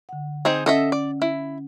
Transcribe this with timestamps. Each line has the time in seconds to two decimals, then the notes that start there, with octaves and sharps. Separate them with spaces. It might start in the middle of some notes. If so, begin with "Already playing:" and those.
0.09 D3 F#5
0.45 C4 D#4 G#4
0.66 C#4 A4 D#5 E5 F#5
0.92 D5
1.22 E4